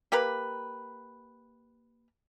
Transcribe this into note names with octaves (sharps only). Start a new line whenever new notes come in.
A#3 G4 A#4 B4